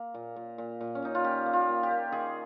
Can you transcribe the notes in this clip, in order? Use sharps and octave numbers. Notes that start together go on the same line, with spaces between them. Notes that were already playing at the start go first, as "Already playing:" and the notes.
Already playing: A#3
A#2
A#2
A#2
A#2
C#4
A#2 D#4
F4
A#3 G4
A#3
F4
A#3
G4
A#3
D#3 G#4